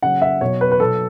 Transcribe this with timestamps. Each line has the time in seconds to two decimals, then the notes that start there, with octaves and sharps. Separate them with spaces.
0.03 C#3 F#3 F#5
0.22 E5
0.41 B2 F#3 C#5
0.61 B4
0.71 B4
0.79 B2 F#3 A4